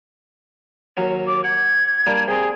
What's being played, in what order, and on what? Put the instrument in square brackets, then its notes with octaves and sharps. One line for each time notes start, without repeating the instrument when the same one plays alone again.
[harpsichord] D#2 F#3 C#4
[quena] D6
[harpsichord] F#5 [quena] G#6
[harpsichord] G3 A#3 D4
[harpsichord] C3 C4 [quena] G#4